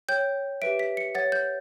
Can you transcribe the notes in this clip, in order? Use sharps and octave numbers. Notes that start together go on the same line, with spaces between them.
C#5 G5 G6
G4 B4 E5 D7
B6
C#7
C#5 F#5 A6
G6